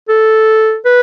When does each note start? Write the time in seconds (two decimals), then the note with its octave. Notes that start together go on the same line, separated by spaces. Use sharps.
0.09 A4
0.85 B4